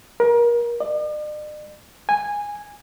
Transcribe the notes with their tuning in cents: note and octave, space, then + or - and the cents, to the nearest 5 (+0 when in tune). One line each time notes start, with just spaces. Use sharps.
A#4 +30
D5 +45
G#5 -10